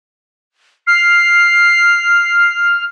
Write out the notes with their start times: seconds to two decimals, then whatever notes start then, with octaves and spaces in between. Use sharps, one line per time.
0.87 F6 C7